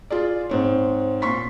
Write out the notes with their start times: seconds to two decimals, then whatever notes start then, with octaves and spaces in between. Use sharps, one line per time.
0.10 F4 G#4 D5
0.49 G#2 C4 C#5
1.22 A#2 C6 C#6 B6